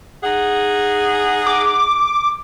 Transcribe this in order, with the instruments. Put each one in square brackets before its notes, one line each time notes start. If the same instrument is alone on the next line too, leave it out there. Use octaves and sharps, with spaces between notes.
[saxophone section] D#4 G#4 [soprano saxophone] F#5
[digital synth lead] D6